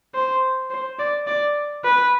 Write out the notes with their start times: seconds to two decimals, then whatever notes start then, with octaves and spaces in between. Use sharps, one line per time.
0.15 C5
0.70 C5
0.99 D5
1.27 D5
1.85 B4